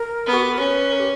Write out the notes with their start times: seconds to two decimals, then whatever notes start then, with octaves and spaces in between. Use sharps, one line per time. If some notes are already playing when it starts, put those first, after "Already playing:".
Already playing: A#4
0.26 B3
0.33 F#4
0.42 G4
0.51 A#4
0.59 C#4 B4
0.92 A#4
1.00 G4